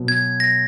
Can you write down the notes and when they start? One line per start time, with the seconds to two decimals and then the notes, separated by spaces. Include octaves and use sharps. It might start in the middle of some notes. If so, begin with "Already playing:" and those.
Already playing: B2 F#3
0.08 G#6
0.40 A#6